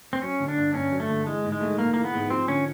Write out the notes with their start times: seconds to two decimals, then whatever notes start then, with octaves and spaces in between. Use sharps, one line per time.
0.13 C4
0.22 F#3 C#4
0.40 D3
0.48 D4
0.57 G2
0.74 G2 C#4
0.92 F#3
1.00 A3
1.09 D3
1.26 E3 G#3
1.44 G#2
1.52 G#3
1.60 A3
1.78 A#1 A#3
1.94 E3 A#3
2.04 B3
2.13 G#2
2.30 F3 C4
2.48 D3 C#4